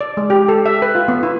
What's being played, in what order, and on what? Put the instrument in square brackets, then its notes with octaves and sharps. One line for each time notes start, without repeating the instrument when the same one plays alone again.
[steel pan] D5
G#3
G4
A4
E5
B4
F4
B3
E4